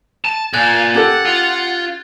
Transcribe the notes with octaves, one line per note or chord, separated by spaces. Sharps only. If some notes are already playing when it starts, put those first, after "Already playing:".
A5
A#2 F5 G#5 F#6 G#6 A6
C#4 G4 A4 F#5
F4